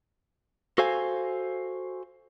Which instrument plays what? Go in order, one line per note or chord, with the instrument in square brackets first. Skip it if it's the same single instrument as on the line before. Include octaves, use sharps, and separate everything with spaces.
[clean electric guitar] F#4 A4 C5 F5 G#5